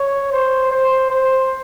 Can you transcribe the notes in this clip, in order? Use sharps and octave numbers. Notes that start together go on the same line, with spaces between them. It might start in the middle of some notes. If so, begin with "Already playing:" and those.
Already playing: C#5
C5
C5
C5